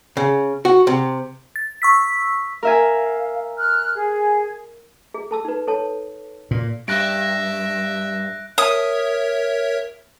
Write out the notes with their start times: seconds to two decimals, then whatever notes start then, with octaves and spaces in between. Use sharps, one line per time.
0.17 C#3
0.65 F#4
0.87 C3
1.56 A6
1.82 C#6 E6 B6
2.63 A#4 E5 F5 G#5
3.58 F6 F#6
3.94 G#4
5.14 G#4
5.31 A4 A5 E6
5.45 D#4 B4
5.68 A4 C#5 A5
6.51 A#2
6.88 G2 E5 F#6 A#6 D7
8.58 A#4 C#5 E5 D#6